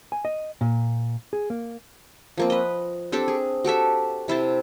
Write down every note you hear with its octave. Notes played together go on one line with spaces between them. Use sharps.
G#5
D#5
A#2
G#4
A#3
F3 A#3 C4
B4 D#5
C4 D4 G4 A4
G#4
F#4 G4 A4 E5
C3 E4 C5 A5